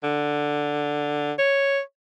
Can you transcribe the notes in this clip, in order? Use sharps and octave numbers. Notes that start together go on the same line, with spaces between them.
D3
C#5